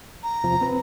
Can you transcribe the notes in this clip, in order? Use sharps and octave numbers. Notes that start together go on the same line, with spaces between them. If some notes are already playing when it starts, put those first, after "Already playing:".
A#5
E2 C3 F3
C4 B4